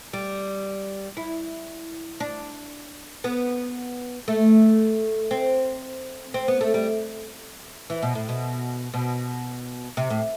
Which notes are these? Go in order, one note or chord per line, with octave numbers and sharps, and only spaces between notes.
G3
E4
D4
B3
A3
C4
C4
B3
A3
G3
E3
B2
A2
B2
B2
C3
A2